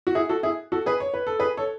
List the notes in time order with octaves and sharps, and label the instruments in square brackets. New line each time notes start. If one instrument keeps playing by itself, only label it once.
[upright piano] F#4
E4 G#4
F#4 A4
E4 G#4
F#4 A4
G#4 B4
C#5
B4
A4
G#4 B4
A4 C#5